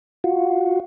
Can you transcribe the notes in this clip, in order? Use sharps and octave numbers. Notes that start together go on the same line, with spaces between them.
F4 F#4